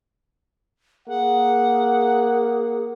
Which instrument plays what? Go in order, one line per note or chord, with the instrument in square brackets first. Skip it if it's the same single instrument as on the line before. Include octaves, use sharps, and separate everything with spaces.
[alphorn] A#3 [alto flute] G#4 [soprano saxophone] F#5